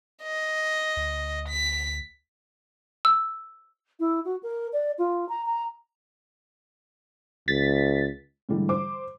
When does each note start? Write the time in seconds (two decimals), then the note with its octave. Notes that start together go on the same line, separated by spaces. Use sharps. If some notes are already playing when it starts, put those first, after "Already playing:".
0.23 D#5
0.97 D2
1.49 B6
3.05 E6
4.00 E4
4.25 F#4
4.43 A#4
4.73 D5
4.98 F4
5.29 A#5
5.46 A#5
7.48 C#2 A6 B6
8.49 G#2 D3 E3 G3 A3
8.69 C5 D6